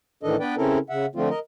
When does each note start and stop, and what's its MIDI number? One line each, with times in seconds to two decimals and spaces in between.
0.23 0.36 45
0.23 0.36 51
0.23 0.36 52
0.23 0.36 62
0.23 0.36 69
0.23 0.36 75
0.40 0.55 59
0.40 0.55 62
0.40 0.55 71
0.40 0.55 74
0.40 0.55 79
0.57 0.78 49
0.57 0.78 60
0.57 0.78 61
0.57 0.78 64
0.57 0.78 69
0.57 0.78 70
0.90 1.06 49
0.90 1.06 76
0.90 1.06 78
1.15 1.29 50
1.15 1.29 53
1.15 1.29 57
1.15 1.29 60
1.15 1.29 65
1.30 1.39 70
1.30 1.39 75